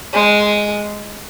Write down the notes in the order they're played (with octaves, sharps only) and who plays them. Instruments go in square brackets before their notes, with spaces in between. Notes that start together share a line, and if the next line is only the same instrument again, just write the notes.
[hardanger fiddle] G#3